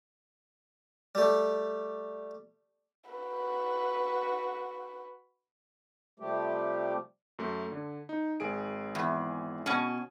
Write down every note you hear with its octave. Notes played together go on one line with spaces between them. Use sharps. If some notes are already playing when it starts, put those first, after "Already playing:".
G3 A3
F#4 B4
C3 F3 G3 A3 G4
F#2 A3
D3
D#4
G#1 G#4 D7
E2
B2 C#4